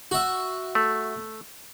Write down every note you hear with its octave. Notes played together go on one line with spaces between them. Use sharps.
F#4 E5
A3